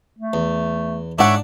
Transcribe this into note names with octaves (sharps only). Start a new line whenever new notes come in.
A3
E2
G#2 D4 C#5 D5 E5 F#5 D6